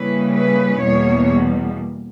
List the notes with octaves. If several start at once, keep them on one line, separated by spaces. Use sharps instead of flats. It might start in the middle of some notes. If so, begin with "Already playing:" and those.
Already playing: C#3 G3 A#3 C#4 E4 B4
B4
E2 B2 G3 A#3 C#5